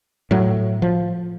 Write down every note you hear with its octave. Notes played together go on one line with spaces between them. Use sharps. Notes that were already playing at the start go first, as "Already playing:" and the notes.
A2 F#3
F3